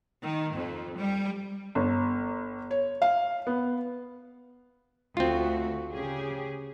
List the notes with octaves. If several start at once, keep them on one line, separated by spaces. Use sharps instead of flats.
D#3
F2
G3
G1
C#5
F5
B3
D2 A3 C4 F4 F#4
C#3 G4 G#4